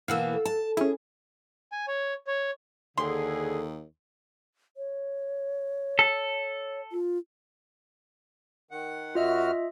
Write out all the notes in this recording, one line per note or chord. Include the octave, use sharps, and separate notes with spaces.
B2 E3 A#3 F5 F#5 E6
A4
A5
C#4 E4 G#4
G#5
C#5
C#5
D#2 D3 G#4 A4 C6
C#5
A4
F4
D#3 F#5
F#2 F4 F#4 D#5 E5 F6